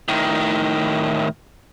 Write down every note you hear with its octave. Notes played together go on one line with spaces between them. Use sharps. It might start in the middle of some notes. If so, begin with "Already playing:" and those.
A2 D#3